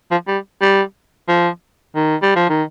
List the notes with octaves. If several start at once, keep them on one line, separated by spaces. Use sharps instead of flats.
F3
G3
G3
F3
D#3
G3
F3
D#3